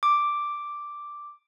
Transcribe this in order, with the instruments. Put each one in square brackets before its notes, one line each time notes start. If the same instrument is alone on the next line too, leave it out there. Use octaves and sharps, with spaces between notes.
[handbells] D6